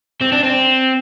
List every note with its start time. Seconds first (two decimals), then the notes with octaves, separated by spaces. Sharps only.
0.21 C4
0.32 D4
0.43 C4